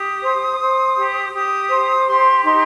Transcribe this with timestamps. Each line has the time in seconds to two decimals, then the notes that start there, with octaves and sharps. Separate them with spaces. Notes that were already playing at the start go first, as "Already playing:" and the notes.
Already playing: G4 D#6
0.23 C5
0.60 C5
0.96 G4
1.34 G4 D#6
1.70 C5
2.07 G4 C6
2.44 D#4 C6